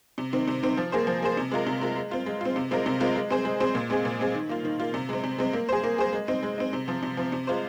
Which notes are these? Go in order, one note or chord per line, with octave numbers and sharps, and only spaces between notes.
C3
D#3 C4
C3
D#3 C4
F3
A#3 G#4 C5
F3
A#3 G#4 C5
C3
G#3 F4 A#4
C3
G#3 F4 A#4
G#3
C4 F4
G#3
C4 F4
C3
G#3 C4 F4 A#4
C3
G#3 C4 F4 A#4
G#3
C4 G#4 C5
G#3
C4 G#4 C5
A#2
G#3 C4 G#4
A#2
G#3 C4 G#4
D#3
A#3 F4
D#3
A#3 F4
C3
G#3 C4
C3
G#3 C4
A#3
G#4 C5
A#3
G#4 C5
G#3
C4 D#4
G#3
C4 D#4
C3
F3 C4
C3
F3 C4
C3
G#3 F4 C5